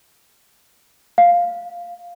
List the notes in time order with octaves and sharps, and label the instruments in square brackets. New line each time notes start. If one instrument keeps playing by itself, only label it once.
[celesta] F5